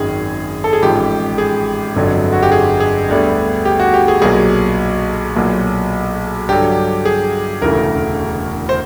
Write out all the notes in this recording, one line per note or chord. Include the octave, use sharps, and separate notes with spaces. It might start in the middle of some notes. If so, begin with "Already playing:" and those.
Already playing: G#1 F#2 D#3 G#4
A4
G#4
A1 G#2 F3 G4
G#4
G1 F2 D3 F#3
F#4
G4
G#4
G#4
D2 D3 G3 B3
G4
F#4
G4
G#4
B1 A#2 F#3 A#3 G#4
B1 A#2 F#3 A#3
G2 D3 F#3 G4
G#4
E1 D2 C#3 E3 A3 A#4
C5